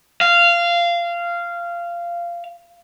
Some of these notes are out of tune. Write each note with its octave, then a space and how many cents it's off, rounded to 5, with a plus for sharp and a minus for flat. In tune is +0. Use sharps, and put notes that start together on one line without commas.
F5 -15